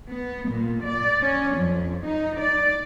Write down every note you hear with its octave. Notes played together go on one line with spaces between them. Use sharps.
B3
A#2
D5
C#4
F2
D#4
D5